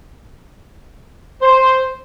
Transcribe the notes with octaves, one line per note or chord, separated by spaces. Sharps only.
C5